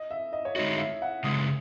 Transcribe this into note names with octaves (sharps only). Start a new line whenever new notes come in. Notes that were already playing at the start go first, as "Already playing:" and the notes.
Already playing: D#5
E5
D#5
C#5
G#3 D#4 F#4 D#5
E5
F#5
C#3 E3 G#3 D#6